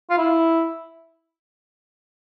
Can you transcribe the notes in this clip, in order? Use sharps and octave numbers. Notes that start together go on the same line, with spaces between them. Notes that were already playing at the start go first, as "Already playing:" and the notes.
F4
E4